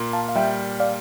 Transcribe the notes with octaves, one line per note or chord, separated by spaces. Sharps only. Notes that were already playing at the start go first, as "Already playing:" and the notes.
Already playing: A#2 A#3
F5 A5
F5
G3 E5 G5
D5 F5